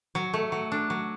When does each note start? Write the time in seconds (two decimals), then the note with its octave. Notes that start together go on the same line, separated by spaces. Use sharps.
0.15 F#3
0.34 A3
0.52 F#3
0.72 D4
0.90 F#3